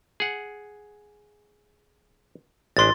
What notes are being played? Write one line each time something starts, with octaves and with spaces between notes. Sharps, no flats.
G#4 F#5
A1 G#3 D4 C6 A6